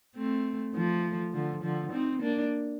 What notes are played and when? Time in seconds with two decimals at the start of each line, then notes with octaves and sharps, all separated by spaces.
0.17 A3 C4
0.75 F3 A3
1.33 D3 F3
1.63 D3 F3
1.92 C4 D#4
2.22 A#3 D4